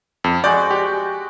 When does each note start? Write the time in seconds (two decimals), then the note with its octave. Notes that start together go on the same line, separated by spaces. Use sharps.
0.24 F2
0.44 G#3 F#4 D5 G5
0.71 G4